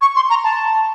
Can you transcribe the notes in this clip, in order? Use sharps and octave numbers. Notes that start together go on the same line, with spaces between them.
C#6
C6
A#5
A5